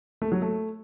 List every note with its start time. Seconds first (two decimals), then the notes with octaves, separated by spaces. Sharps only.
0.22 A3
0.32 F#3
0.42 A3